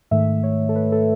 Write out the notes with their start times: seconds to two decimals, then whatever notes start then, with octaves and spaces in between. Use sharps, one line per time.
0.11 G#2 D#3 A3 E5
0.43 C#5
0.69 A4
0.76 B4
0.92 A4